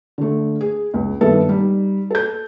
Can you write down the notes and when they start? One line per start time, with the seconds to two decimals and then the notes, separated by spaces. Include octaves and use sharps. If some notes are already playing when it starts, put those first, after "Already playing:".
0.18 D3 A3
0.61 G#4
0.94 C#2
1.21 G2 D#3 B3 A4 E5
1.49 G3 D#4
2.11 A4 G6